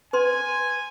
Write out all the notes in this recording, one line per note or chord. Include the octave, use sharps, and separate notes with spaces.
B4 G#5 C6